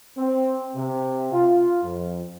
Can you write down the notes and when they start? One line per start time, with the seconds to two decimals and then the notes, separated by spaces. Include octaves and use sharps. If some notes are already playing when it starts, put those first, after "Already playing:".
0.17 C4
0.76 C3
1.33 F4
1.82 F2